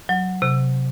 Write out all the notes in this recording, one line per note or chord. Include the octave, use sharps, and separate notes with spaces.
F#3
C3